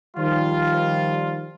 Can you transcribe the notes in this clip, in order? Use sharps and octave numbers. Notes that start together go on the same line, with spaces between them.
D#3 F3 G3 F4